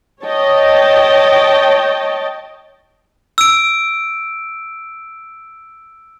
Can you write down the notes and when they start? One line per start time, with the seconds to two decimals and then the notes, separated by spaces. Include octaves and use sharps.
0.24 C#5 D#5 G5 A5
3.38 E6 D7